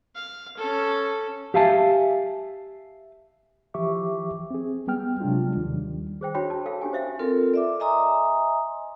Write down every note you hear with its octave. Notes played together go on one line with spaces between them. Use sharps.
F5
C#4 A4
G4 E5 F5 G#5 A5
E3 F3 G4 E5 C#6 D6
C4 G#4
G3 B3 G5 F6
C3 F#3 G#3 D4 F4
D#2 D#3 G3
G#4 C5 G5
D4 F#4 C#5 G5 B5
A5
A4 F5 G5
C#4 D4 G4 G#5
C5 E5 F5
C4 F4 A4 A#4
D5 E5 D6
D#5 E5 G#5 A#5 C6 D#6